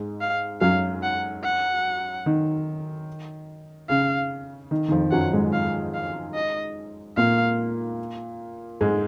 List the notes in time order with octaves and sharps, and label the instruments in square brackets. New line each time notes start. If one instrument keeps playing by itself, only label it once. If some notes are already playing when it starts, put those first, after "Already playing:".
Already playing: [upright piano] G#2 G#3
[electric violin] F5
[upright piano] F#2 F#3 [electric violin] F5
[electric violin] F#5
F#5
[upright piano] D#3
[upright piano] C#3 [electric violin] F5
[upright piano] D#3
D#3
F2 F3
[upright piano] F#2 F#3 [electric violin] F#5
[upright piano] G#2 G#3
[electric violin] F5
F5
D#5
[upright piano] A#2 A#3 [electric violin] F5
[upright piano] G#2 G#3